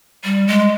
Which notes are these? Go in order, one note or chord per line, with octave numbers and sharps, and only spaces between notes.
G3
G#3